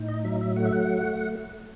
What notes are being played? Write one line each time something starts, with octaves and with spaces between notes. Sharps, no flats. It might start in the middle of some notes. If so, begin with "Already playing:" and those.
Already playing: A2 D#4
D#5
F#3 E5
E5
A3 F#5
E5
F#5